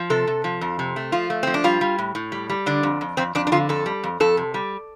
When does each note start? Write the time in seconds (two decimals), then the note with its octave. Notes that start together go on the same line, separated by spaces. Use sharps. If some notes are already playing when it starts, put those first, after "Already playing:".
Already playing: F3
0.10 C3 A4
0.27 C3
0.44 F3
0.61 F2
0.79 C3
0.96 A3
1.12 F3 F4
1.30 A3
1.43 F3 C4
1.54 D4
1.64 G3 F4
1.81 G3
1.98 A2
2.15 A2
2.32 G3
2.49 G3
2.66 D3 D4
2.83 F2
3.01 F2
3.17 F2 C4
3.35 F2 D4
3.47 D4
3.52 D3 F4
3.69 F2 A4
3.86 G3
4.03 F2
4.20 F2 A4
4.37 C3
4.54 G3